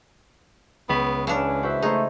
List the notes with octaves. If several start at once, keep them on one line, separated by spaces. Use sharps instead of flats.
C#2 B3
C#3 E3 C#4 D4
F#4 C5 E5
A3 D#4 G#4 C5